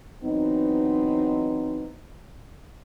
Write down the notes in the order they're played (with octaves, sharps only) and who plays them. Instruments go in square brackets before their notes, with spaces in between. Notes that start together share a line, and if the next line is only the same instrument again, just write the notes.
[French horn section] E3 F#3 B3 C4 D#4